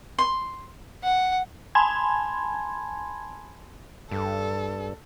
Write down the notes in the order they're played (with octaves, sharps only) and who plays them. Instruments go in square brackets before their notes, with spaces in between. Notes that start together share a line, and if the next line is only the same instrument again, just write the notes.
[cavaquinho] C6
[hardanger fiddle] F#5
[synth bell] G#5 A5 B5 C6 G#6
[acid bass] G2 [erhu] A4